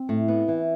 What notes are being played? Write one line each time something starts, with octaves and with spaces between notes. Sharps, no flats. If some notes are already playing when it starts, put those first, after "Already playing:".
Already playing: C4
A2
B3
E3